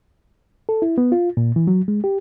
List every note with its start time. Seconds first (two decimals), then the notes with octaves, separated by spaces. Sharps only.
0.69 A4
0.82 E4
0.98 B3
1.12 F4
1.37 A#2
1.56 E3
1.67 F#3
1.88 G#3
2.04 G4